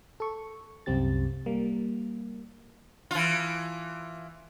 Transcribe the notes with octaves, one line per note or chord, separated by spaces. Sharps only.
A4 C#6
C2 F#2 C4 G4 A6
G3 A#3
E3 F4